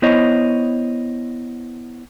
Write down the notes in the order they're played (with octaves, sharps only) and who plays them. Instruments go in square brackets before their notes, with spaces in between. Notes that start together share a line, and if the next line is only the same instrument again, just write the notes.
[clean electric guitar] B3 E4 C5 C#5 D#5